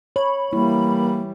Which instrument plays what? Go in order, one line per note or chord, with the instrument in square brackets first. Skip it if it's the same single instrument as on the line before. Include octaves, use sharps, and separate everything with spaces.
[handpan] C#5 [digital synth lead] B5
[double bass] E3 G3 [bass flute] A#3 [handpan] E4